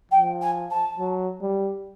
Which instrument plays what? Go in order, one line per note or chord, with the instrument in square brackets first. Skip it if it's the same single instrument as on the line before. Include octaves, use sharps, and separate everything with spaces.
[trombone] F3 [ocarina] G5
[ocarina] G#5
A5
[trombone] F#3
G3